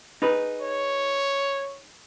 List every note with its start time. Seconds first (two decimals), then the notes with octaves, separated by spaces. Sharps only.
0.22 D#4 G#4 B4
0.61 C#5